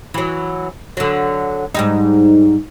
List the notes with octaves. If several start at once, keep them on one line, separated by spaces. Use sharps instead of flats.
E3 F#3
D3 F#3
G#2 G3 D#4